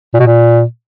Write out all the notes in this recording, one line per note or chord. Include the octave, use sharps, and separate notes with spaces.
A#2
B2
A#2